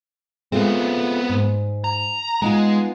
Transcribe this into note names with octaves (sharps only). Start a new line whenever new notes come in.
G#3 A3 B3 C4 F4
G#2
A#5
G#3 B3 D#4 F4